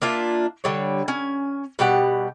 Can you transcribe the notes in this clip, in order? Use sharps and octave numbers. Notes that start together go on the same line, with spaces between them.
A#3 D4 F4 E5
D3 G3 C#5
C#4 G#5
B2 G3 G4 F#5